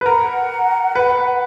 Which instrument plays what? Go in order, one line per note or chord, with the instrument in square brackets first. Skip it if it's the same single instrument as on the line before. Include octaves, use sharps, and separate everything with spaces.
[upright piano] B4
[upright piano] A#4 [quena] F#5
[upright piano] B4